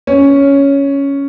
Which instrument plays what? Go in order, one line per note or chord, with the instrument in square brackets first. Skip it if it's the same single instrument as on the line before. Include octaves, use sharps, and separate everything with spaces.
[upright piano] C#4